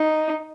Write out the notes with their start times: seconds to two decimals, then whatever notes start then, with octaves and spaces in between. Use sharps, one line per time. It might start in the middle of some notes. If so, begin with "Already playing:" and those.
Already playing: D#4